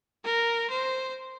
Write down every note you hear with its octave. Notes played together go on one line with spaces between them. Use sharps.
A#4
C5